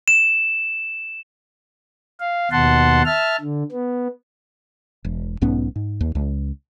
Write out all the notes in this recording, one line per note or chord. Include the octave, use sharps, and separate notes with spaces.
E7
F5
D#2 B2 F#5 A5 C6
E5 A5 F6
D3
B3
E1
B1 G#2 B3 C#4
G#2
D#2
C#2